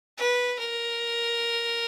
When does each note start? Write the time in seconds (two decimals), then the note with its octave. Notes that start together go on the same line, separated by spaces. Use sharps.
0.17 B4
0.60 A#4